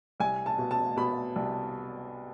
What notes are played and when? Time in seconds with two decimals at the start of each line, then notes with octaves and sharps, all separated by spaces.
0.20 C2 G#5
0.46 A5
0.58 B2
0.71 A5
0.97 B2 B5
1.36 C2